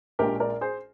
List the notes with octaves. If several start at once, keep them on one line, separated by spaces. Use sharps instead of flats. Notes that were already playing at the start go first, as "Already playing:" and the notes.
A#1 A#2 G#3 D4 G4 A#4
A#4 D5
G#4 C5